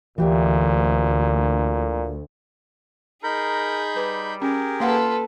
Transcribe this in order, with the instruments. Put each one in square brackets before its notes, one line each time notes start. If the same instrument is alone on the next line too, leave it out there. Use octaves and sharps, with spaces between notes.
[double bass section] D2 [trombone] A#2 [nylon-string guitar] E3 G4 E5
[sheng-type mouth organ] D#4 B5 G6 [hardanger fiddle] G#4 [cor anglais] A#4
[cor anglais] G3 [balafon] B4
[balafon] C#4 [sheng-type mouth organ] G4 G#4 A#4
[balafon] A#3 F5 F#5 [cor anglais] F4 [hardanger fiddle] A4 B4